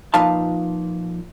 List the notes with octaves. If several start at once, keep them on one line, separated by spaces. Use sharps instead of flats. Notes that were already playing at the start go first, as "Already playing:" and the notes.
A#2 F3 D#4 B4 F5 A5